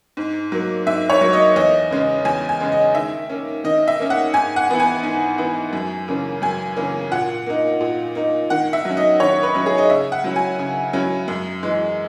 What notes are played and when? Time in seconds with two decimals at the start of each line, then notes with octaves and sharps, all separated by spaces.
0.17 G#2
0.52 F#3 A#3
0.87 G#2 E5
1.10 C#5
1.21 F#3 A#3
1.33 D#5
1.56 E2 D#5
1.90 C#3 G#3 C#4
2.25 E2 G#5
2.49 G#5
2.60 C#3 G#3 C#4
2.72 D#5
2.95 D#3 E5
3.29 A#3 C#4
3.64 D#3 D#5
3.88 E5
3.99 A#3 C#4
4.10 F#5
4.34 G#2 G#5
4.56 F#5
4.69 E3 B3 E4
4.80 G#5
5.03 G#2
5.38 E3 B3 E4
5.73 F#2
6.08 C#3 E3 A#3 C#4
6.42 F#2 G#5
6.77 C#3 E3 A#3 C#4
7.12 A#2 F#5
7.46 A#3 D#4
7.81 A#2
8.15 A#3 D#4
8.50 D#3 F#5
8.73 E5
8.85 F#3 C#4
8.97 D#5
9.20 D#3 C#5
9.43 B4
9.55 F#3 C#4
9.66 G#4
9.78 D#5
9.90 C#3 E5
10.12 F#5
10.24 F#3 C#4 E4
10.36 G#5
10.59 C#3
10.93 F#3 C#4 E4
11.28 F#2
11.63 E3 G#3